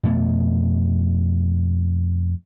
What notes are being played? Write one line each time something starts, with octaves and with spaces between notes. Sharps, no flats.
F2 B2 A3 B3